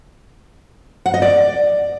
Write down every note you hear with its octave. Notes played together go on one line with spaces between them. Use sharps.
F#5
D#5
D5